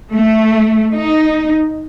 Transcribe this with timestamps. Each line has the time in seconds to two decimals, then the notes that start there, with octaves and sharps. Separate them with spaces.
0.13 A3
0.94 D#4